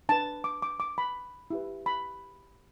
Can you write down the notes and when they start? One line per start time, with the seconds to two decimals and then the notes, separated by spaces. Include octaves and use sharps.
0.09 D4 B4 A5
0.44 D6
0.62 D6
0.80 D6
0.98 B5
1.50 E4 G4 B4
1.86 B5